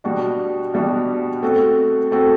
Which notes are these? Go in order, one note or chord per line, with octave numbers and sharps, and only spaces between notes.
B2 G3 B3 D4 F#4
B2 G3 B3 D4 F#4
A3 C4 F#4 A4
A3 C4 F#4 A4